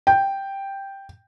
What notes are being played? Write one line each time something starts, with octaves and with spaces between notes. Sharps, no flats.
G5